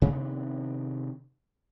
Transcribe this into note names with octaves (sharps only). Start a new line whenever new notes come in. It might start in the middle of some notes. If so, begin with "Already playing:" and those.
C3 D#3 B3 D4